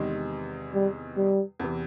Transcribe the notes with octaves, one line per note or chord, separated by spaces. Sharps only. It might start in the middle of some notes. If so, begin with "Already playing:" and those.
Already playing: E2 C3 D#3 G#3
G3
G3
E2 C3 E3